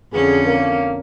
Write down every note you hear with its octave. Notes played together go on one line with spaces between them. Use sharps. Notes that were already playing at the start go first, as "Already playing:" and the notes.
F2 D3 C#4 G#4
A#3